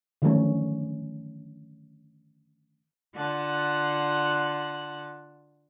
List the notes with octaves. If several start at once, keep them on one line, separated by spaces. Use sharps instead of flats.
D3 D#3 F3 F#3 A3 C#4
D3 F4 F#5 A5 F#6